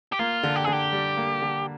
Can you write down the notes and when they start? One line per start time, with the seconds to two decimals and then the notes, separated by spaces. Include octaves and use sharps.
0.12 G4
0.19 A#3 F4
0.43 D3
0.56 G4
0.64 D3 G#4
0.73 G4
0.93 G3
1.17 A#3
1.42 D3